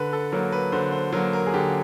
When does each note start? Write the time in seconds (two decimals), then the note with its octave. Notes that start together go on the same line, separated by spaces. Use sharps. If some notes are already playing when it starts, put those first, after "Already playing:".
Already playing: D3 B4
0.13 A4
0.32 F#3 A#3 A#4
0.52 B4
0.72 D3 C5
0.92 C5
1.12 F#3 A#3 A#4
1.33 A#4
1.47 G#4
1.54 D3 G4